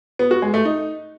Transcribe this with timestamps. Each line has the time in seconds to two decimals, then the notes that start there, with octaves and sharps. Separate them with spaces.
0.19 B3
0.31 F#4
0.42 G#3
0.54 A3
0.65 D#4